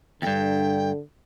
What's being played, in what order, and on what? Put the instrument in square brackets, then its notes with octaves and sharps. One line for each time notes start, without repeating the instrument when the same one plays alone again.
[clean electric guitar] E2 G2 [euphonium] D3 [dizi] G5